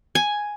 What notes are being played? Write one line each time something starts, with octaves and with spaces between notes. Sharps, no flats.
G#5